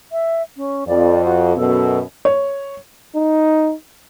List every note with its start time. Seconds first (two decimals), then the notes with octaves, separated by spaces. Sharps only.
0.12 E5
0.57 C#4
0.88 F2 D5
1.24 F#4
1.57 F#2 B2 A4
2.25 C#5
3.16 D#4